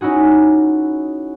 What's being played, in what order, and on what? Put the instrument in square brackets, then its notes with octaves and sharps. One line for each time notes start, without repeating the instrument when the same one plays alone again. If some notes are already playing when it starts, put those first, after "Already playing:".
[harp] C#4 D#4 E4 F#4 G#4